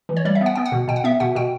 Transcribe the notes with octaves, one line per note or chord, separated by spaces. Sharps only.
E3
C#5
G3 D5
E5
B3
F#5
B3 G5
F#5
B2
B2 G5
F#5
B3 E5
B2 F#5
B2 G5